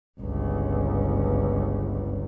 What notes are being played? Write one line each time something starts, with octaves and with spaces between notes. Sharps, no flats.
G1 C#2